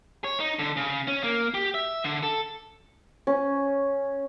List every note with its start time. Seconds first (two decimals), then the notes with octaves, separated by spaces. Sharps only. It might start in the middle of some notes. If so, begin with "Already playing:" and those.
0.24 C#5
0.40 D#4
0.59 D3
0.77 C#3
1.08 C#4
1.24 A#3
1.54 G4
1.74 E5
2.04 D3
2.23 A4
3.27 C#4